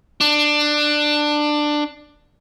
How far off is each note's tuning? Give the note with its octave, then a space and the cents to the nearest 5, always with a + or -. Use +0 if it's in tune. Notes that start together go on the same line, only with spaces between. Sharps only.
D4 +15